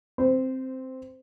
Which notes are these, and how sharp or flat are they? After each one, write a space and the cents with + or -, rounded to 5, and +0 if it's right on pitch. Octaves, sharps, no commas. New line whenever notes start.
C4 +0 C5 -15